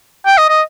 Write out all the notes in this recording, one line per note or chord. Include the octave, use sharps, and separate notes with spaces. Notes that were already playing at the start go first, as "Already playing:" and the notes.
G5
D#5
D#5